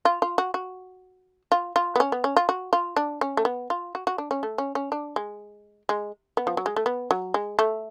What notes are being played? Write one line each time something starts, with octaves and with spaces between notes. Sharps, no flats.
F4
F4
F#4
F#4
F4
F4
B3
C#4
B3
C#4
F4
F#4
F4
D4
C#4
A3
B3
F4
F#4
F#4
D4
C#4
A3
C#4
C#4
D4
G#3
G#3
B3
F3
F#3
G#3
A3
B3
F#3
G#3
A3